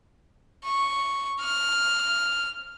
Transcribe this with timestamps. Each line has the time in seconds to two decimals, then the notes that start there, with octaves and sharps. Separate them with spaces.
0.65 C#6
1.41 F6